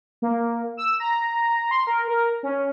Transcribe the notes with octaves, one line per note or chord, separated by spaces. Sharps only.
A#3
E6
A#5
C6
A#4
A#4
C#4